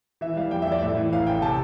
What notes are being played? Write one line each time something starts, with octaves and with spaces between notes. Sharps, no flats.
E3 E5
G3 F5
F2 G5
E5
F2
D5
A2 E5
E3
A1 F5
A1 G5
C3 A5